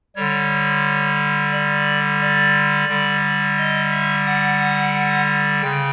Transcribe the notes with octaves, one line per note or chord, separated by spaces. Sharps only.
D3 G3 C#5
D5
D5
D3 G3
D#5
E5
F#5
C#3 G5